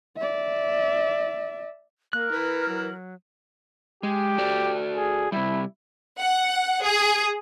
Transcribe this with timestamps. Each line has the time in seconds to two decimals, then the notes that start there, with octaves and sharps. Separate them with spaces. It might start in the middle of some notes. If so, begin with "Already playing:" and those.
0.17 D5 E5
2.13 A#3 A#4 F#6
2.32 E3 B4
2.68 F#3
4.03 G#3 G4
4.38 F#4 A4 D5
4.96 G#4
5.32 C3 G3 E4
6.20 F#5
6.83 G#4